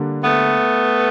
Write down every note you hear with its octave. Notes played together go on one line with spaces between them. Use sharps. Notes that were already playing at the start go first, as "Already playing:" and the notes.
Already playing: D3 G3 A#3 D4
A3 B3